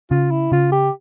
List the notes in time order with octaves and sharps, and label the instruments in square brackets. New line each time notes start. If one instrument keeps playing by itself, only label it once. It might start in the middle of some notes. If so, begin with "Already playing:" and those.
[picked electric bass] C#3 [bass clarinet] F4
[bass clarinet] E4
[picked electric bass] C#3 [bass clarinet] F4
[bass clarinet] G4